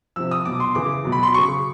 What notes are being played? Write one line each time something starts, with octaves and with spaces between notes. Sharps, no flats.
C3 F3 E6
D#6
B2 F#3 D6
C6
C#3 E3 D6
B2 F#3
B5
C6
C#3 F#3 C#6